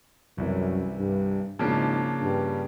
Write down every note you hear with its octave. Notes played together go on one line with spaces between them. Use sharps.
C2 F#2 C3 E3
G2
G#1 G#2 C#3 F3 A#3 D4
G2